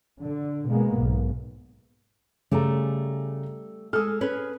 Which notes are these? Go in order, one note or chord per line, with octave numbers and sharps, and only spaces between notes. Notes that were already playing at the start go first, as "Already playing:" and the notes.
D3
B2 G#3 A#3 B3
B1 G#2
C#3 G3 A3 G4 G#4 A#5
G#3 A4 D#6 F6
C#4 G#4 B4